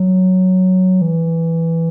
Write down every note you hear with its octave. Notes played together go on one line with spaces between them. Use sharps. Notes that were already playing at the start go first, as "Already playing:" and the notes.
Already playing: F#3
E3